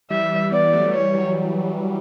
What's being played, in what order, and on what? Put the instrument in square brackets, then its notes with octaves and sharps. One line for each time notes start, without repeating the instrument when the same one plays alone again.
[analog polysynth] E3 G3 [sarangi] E5
[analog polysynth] G3 B3 [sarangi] D5
[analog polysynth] F#3 A3
[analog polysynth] E3 G3 [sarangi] C#5
[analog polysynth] F#3